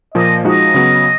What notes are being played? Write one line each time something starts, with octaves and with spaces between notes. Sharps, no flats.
A#2 F3 A#3 D#5
F3 G#3 D#4 F#4 D#5
C#3 F#3 B3